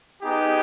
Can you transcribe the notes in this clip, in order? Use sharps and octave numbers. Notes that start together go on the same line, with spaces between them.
B3 D#4 G4 G#4